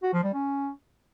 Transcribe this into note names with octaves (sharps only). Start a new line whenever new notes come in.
F#4
F3
G3
C#4